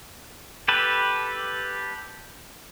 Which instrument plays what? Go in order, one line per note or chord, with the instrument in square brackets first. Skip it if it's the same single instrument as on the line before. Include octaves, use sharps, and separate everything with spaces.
[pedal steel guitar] G4 A4 B4